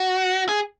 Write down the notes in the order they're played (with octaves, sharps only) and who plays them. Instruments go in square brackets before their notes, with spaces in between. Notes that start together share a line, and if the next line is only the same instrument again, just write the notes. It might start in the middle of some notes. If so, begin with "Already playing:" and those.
Already playing: [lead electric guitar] F#4
G#4